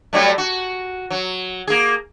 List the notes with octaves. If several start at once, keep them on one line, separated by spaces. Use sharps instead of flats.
F#3 G3 A3
F#4
F#3
A#3 G#4